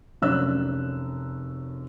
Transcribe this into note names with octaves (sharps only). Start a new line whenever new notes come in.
F1 F#2 D4 C#5 E6 F#6